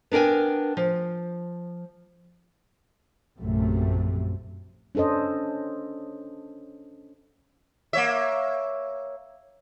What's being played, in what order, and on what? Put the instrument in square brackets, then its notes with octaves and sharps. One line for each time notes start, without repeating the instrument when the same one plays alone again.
[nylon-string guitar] B3 D4 A#4 G5 G#5
F3
[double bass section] A#1 F#2 C3 A3
[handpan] C#4 D4 A4 C5 D#5
[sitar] A#3 C#5 E5